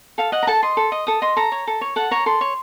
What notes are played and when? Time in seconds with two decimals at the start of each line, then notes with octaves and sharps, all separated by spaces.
0.18 A4 F5
0.32 D#5 F#5
0.43 A#5
0.47 A4 A5
0.63 D#5 C6
0.77 A4
0.92 D#5
1.07 A4 D#6
1.22 D#5 C6
1.36 A4 A#5
1.52 C#5
1.67 A4
1.81 C#5
1.96 A4 F#5
2.11 C#5 A#5
2.26 A4 C6
2.41 C#5